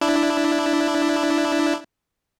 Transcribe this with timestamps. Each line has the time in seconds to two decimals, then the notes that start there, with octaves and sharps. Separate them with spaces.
0.01 D4 E4